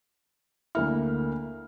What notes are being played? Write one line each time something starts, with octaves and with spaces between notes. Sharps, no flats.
D2 A#3 E4 F6